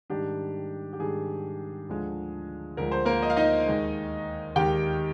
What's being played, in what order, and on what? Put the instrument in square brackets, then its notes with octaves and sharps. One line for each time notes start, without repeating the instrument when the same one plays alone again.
[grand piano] G#2 D#3 G3 D4 G4
G4
G#2 D#3 G3 D4 G#4
D2 D3 F3 G#3
D2 D3 F3 G#3 A#4
C5
A#3 A#4
D#5
F5
D#4 D#5
D#2 D#3 G#3
D#2 D#3 G#3 G4 G5